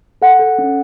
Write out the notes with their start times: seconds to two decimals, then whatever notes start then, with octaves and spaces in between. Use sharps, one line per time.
0.22 A4 F#5
0.39 A4
0.59 C#4